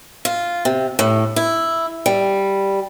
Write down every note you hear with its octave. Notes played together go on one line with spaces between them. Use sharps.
F4
C3
A2
E4
G3